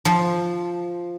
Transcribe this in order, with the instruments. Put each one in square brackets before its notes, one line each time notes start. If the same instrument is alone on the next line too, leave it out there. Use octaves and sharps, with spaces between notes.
[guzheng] F3